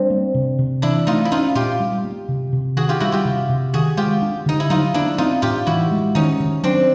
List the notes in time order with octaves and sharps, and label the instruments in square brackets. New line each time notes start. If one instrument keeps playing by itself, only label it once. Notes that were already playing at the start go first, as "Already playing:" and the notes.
Already playing: [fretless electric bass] G3 [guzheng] C4 D4
[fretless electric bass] A#3
C3
C3
[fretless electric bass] E3 [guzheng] D4 E4
[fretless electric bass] A3 [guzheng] D#4 F4
[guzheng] E4
[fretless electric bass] C#4 [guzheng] D#4 F4
[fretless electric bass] A#2 [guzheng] F4 G4
[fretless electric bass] G3
A#3
C3
C3
[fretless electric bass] D#3 [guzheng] F#4 G#4
[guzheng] F4 G4
[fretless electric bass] G3 [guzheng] E4 F#4
[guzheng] F4 G4
[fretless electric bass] C3
C3
[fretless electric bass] D#3 [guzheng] F#4 G#4
[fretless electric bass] G#3 [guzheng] F4 G4
[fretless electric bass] D4
[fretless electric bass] D3 [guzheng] D#4
[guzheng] E4
[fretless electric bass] F#3 [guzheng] D#4 F4
[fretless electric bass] A#3 [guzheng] D4 E4
[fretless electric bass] C4 [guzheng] D#4 F4
[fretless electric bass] A2 [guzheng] F4 G4
[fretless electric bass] E3 [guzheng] E4 F#4
[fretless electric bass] G#3
[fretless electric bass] D#3 [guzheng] C#4 D#4
[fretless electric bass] D#3
[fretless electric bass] F#3 [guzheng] C4 D4